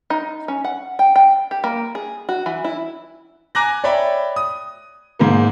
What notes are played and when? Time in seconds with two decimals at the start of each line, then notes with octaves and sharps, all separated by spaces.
0.10 D#4
0.48 C#4
0.64 F#5
0.99 G5
1.16 G5
1.51 G4
1.64 A#3
1.95 G#4
2.29 F#4
2.46 E3
2.64 E4
3.55 G#5 A#5 D6 F#6 A#6
3.84 C#5 D5 E5 G5 B5
4.36 D#6
5.19 G#2 G#3 A#3